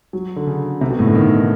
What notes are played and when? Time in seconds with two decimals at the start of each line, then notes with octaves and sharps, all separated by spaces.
0.13 F#3
0.36 D3
0.47 C#3
0.81 C3
0.90 B2
0.99 A2
1.07 D3
1.15 D#3